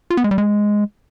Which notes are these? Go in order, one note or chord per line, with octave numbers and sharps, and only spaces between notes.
F4
B3
G#3
G3
G#3